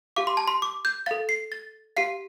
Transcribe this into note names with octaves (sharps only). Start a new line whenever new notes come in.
G4 F5 D6
C6
A5
C6
D6
G6
A4 F5 A6
C7
A6
G4 F5 C7